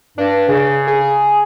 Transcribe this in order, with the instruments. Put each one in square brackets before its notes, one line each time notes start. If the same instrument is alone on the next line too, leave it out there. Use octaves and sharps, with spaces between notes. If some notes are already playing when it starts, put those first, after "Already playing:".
[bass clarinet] G2 [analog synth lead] D4
[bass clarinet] C#3
[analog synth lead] G#4